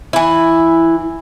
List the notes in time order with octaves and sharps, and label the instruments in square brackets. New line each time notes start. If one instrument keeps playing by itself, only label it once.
[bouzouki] E3 E4